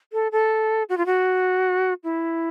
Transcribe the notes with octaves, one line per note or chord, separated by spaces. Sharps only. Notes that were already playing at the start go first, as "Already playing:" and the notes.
A4
A4
F#4
F4
F#4
E4